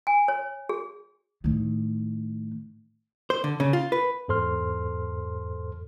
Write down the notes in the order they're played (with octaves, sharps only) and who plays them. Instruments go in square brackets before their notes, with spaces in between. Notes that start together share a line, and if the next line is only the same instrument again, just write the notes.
[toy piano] G#5
C#5
G#4
[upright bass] A2 D#3
[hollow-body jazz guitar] C5
D3
C#3
F4
B4
[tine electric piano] E2 G#2 A4 C5 C6 F6